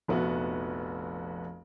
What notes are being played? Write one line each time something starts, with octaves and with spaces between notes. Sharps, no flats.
F1 A#1 B3 E4 F#4